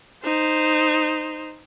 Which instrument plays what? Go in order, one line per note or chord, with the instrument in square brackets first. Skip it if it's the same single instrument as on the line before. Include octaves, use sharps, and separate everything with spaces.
[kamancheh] D#4 C5